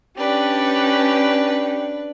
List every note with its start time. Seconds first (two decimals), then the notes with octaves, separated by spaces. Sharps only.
0.17 C#4 D4 G4 B4